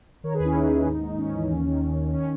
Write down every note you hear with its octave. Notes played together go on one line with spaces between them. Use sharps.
D#3 A#4 C#5
G#4 B4
D#2
C#4 E4
D#2 D#4
D#2
G#2
G#2
G#2 C#4
E3
D#2
D#3
D#3
D#3
D#3 C#4